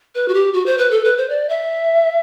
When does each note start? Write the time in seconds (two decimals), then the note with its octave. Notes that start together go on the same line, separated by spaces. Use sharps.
0.15 B4
0.28 F#4
0.34 G4
0.53 F#4
0.66 C5
0.78 B4
0.91 A4
1.05 B4
1.17 C5
1.29 D5
1.49 E5